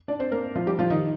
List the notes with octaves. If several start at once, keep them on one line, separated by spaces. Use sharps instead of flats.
D4 D5
C4 C5
A#3 A#4
F3 F4
G3 G4
F3 F4
D#3 D#4